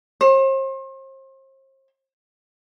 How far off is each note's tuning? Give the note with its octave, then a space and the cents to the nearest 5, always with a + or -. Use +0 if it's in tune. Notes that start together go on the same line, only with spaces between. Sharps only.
C5 +40